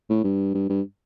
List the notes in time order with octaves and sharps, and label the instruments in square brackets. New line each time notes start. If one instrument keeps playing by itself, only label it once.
[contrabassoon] A2
G2
G2
G2